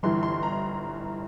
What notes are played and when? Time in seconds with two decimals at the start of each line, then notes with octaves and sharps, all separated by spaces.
0.03 G1 G2 E3 C6
0.23 C6
0.43 A#5